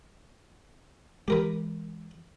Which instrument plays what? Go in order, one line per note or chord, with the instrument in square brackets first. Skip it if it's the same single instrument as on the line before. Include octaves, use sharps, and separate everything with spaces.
[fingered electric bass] E3 G#3 [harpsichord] G4 A#4 B4